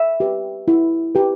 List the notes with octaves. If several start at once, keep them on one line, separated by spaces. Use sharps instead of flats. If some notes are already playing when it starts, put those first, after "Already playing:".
Already playing: E5
G4 B4
E4
G4 B4